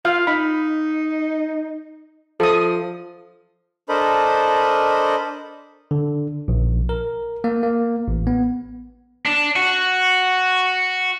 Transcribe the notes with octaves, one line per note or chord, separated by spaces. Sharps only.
F4 F5
D#4 B5
F3 A4 D#6
D4 A4 A#4 C5 D#5 B5
D3
A#1
A#4
A#3
A#3
A1
B3
D4
F#4